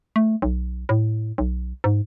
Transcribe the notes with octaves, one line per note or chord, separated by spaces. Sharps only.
A3
B1
A2
B1
G#2